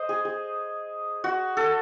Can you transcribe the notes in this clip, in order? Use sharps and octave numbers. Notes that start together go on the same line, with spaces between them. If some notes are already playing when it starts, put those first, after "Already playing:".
Already playing: C5 D#5
G#4
G#4
F#4
A4